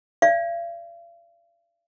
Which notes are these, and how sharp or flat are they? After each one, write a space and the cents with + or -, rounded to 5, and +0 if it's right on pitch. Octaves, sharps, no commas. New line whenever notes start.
D5 +0 F5 -40